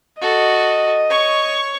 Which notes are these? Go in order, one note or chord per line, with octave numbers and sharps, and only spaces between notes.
F#4 A4 D#5
C#5 C#6